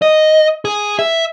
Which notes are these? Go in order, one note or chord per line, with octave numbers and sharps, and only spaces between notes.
D#5
G#4
E5